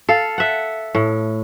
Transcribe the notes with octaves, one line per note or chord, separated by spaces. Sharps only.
A4 F5
E5 F#5
A2